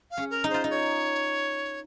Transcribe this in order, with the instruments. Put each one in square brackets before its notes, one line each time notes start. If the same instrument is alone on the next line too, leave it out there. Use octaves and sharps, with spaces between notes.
[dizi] F5
[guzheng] C#4
[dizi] A#4
[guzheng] D#4
[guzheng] F4 [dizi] C5
[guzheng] D#4
[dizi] C#5